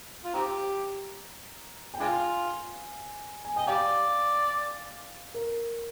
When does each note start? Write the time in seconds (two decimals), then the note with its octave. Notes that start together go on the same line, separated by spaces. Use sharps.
0.25 F4
0.34 C4 D#4 G4 A#5
1.94 G5
2.00 G#3 D4 F4 G#5
3.45 G#5
3.56 D#5 G5
3.67 G4 D5 F5
5.34 A#4